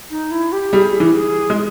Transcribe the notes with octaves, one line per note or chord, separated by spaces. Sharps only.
D#4
E4
G4
G3 G#4
E3
G#4
G#3